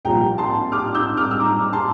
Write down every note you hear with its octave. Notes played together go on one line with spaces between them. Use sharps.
C2 A#2 F3 G5 A#5
A5 C6
D6 F6
E6 G6
D6 F6
E6
A#5 D6
A5 C6